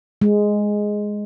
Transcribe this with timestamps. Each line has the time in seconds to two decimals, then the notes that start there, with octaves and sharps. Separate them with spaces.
0.22 G#3